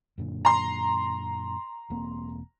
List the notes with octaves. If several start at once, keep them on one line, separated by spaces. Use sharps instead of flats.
F#2 A#2 D3
A#5 C6
E1 A#3 C4